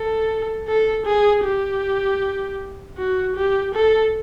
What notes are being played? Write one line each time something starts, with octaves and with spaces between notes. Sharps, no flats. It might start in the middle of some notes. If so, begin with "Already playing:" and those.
Already playing: A4
A4
G#4
G4
F#4
G4
A4